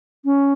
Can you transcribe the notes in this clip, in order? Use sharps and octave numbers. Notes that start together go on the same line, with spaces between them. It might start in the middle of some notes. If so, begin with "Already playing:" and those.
C#4